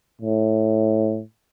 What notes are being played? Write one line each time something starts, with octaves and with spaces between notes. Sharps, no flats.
A2